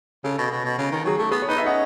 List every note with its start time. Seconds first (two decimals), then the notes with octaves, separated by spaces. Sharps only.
0.24 C#3 A4
0.38 B2
0.51 B2
0.64 B2
0.78 C#3
0.92 D#3
1.04 F#3 G#4
1.18 A3 A4
1.31 B3 G#4 B4
1.42 C#5
1.48 D#4 B4 D#5
1.58 E5
1.66 C#4 D#5 F#5